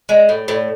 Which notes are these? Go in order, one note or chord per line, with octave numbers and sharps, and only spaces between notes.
G#3
A2
A2